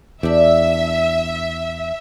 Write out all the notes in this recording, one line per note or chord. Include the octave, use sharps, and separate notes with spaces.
E2 D4 G4 E5